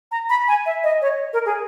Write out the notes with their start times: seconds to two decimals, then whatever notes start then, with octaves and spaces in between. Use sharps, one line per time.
0.11 A#5
0.30 B5
0.48 G#5
0.66 E5
0.84 D#5
1.02 C#5
1.33 A#4
1.46 G#4